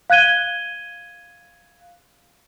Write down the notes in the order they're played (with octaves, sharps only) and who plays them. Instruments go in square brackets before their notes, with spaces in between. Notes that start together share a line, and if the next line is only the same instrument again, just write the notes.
[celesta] F5 F#6 G#6 D#7 G7